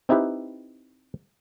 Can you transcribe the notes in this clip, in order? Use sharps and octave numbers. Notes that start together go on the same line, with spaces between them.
C4 D#4 E4 G4 B4